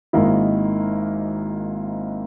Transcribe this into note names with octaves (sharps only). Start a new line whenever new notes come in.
G#1 G#2 D#3 A#3 E4